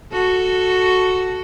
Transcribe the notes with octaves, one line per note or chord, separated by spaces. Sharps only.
F#4 A4